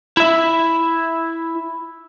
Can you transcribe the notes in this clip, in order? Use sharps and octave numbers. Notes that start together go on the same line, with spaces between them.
E4 E5